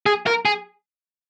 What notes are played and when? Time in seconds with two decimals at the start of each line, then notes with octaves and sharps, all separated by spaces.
0.06 G#4
0.27 A#4
0.45 G#4